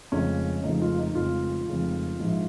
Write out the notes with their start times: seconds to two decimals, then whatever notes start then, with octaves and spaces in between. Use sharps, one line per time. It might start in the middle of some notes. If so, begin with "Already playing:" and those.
0.12 F1 F2 C#3 G#3 C#4
0.63 F1 F2 C#3 G#3 D#4
0.82 F4
0.98 D#4
1.15 F1 F2 C#3 G#3 F4
1.67 F1 F2 C#3 G#3
2.19 A#1 G#2 F3 G#3